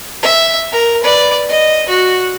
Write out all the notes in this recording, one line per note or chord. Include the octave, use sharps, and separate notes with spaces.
E5
A#4
B4 D5
D#5
F#4